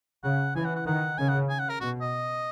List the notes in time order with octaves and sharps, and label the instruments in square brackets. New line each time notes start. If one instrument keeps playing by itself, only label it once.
[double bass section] C#3 [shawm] F#5
[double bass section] E3 [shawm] G#5
[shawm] F#5
F#5
[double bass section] D#3 [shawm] F#5
[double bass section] C#3 [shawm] G#5
[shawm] F#5
G#5
F#5
A#4
[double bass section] B2 [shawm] F#4
[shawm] D#5